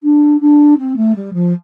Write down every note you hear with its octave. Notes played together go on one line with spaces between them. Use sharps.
D4
D4
C4
A3
G3
F3